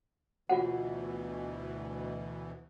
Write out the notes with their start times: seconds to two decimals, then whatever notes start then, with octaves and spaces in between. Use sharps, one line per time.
0.49 D2 B2 E3 F4 F#4 F#5